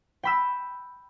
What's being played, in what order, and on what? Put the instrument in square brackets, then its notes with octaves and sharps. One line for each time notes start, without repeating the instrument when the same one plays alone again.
[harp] G5 B5 E6